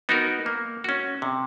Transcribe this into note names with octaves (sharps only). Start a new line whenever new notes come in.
B3 D#4 F#4 A#4
A#3
C#4 F#4
C3